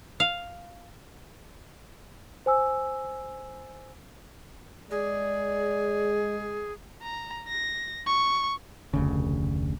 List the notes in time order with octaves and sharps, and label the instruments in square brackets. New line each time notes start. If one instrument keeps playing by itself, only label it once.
[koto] F5
[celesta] C5 G#5 E6
[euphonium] G#3 [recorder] G#4 [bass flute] D5
[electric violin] A#5
A#6
C#6
[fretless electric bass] F1 D2 C#3